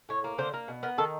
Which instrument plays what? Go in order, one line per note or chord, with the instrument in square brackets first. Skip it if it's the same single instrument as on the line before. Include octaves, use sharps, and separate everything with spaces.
[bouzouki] A2 C#5
A#3
D3 C5
A#3
B2
B3 A#4
D#3 A4